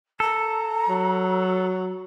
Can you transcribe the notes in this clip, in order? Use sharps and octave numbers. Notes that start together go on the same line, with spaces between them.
A4 A#5
F#3